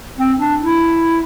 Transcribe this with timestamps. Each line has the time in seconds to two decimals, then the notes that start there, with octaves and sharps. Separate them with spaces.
0.18 C4
0.40 D4
0.61 E4